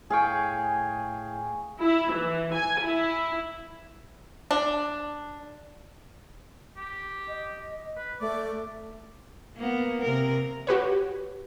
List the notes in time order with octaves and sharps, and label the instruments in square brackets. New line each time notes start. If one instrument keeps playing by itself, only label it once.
[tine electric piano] A2 F5 G5 [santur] G#4 C#6 [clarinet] G#5
[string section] E4
E3
G#5
E4
[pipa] D4
[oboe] G4
[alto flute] D#5
[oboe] B4
[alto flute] A3 [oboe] D5
[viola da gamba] A#3 B3
C3 A#4
[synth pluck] F#4 G4 B4 C#5